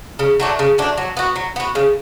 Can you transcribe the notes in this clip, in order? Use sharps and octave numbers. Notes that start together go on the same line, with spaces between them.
C#3
F#3 A3 D4
C#3
F#3 A3 D4
F#3
B3 F#4
F#3
B3 F#4
C#3